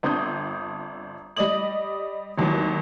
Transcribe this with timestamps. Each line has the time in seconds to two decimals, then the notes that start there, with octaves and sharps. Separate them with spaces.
0.03 G1 C4 D4 D#6 G6
1.36 G3 D5 D#5 D#6 F#7
2.38 G#1 D#2 E3 F#3